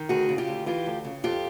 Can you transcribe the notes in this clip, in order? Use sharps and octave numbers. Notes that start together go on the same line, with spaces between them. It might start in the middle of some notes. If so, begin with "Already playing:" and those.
Already playing: D#3
D2 F#4 G#4
C#3
F4 G4
D2
E3 F4 G4
D2
C#3
F2 F4 G4